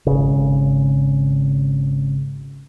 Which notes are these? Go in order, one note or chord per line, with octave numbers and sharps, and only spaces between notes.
G#1 C#3